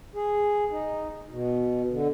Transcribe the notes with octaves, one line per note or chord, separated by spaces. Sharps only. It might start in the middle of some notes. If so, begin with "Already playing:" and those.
G#4
D#4
B2
D3